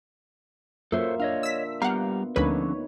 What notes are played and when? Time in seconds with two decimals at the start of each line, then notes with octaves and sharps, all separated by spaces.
0.92 F#2 A#3 F4 A4 C5 C#5 E5
1.20 D4 C#5 D#5 F5
1.43 E6 B6
1.82 G3 B3 G4 F5 F#5 A#5
2.36 D2 D3 F3 A#3 C#4 D#4 B4 C#5